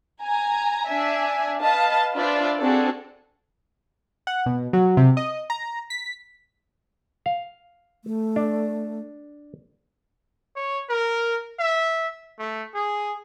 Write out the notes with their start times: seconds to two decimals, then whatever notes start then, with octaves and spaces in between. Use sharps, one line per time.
0.21 G#5 A#5
0.88 D4 E5 G#5
1.59 B4 D#5 F5 A5
2.16 D4 F4 B4 C5 D5 E5
2.59 C4 D4 F#4 G#4 A4
4.27 F#5
4.46 B2
4.73 F#3
4.97 C3
5.17 D#5
5.50 A#5
5.90 B6
7.26 F5
8.05 A3
8.36 D4
10.56 C#5
10.89 A#4
11.59 E5
12.39 A3
12.74 G#4